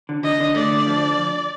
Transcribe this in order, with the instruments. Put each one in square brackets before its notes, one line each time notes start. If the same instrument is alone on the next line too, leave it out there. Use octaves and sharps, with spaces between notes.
[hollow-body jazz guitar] D3
[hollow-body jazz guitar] D3 [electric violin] D#5
[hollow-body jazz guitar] D3
[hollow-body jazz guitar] A3 [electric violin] D5
[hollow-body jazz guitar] D3
F3